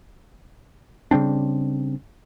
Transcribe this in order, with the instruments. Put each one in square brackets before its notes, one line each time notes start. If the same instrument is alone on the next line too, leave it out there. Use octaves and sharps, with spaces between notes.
[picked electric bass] C#3 G3 C4 D4